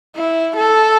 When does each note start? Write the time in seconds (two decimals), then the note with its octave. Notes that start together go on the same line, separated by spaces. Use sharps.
0.15 E4
0.56 A4